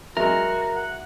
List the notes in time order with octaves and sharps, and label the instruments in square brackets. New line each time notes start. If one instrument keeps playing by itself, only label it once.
[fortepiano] F#3 G#3 [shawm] F#4 [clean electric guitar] A#4 [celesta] E5
[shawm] F#5